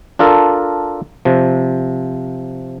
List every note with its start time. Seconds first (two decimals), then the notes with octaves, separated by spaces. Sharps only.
0.19 D4 F4 A4 A#4
1.25 C3 F3